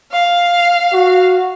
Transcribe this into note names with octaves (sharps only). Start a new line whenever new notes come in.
F5
F#4